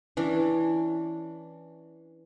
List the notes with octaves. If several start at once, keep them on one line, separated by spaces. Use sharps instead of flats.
E3 C#4 D4